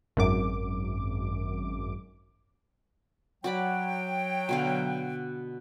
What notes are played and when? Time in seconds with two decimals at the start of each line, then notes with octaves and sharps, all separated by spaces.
0.17 G#1 F#2 D6
3.44 F#3 F#4 D5 G5 B5
4.49 B2 D3 F5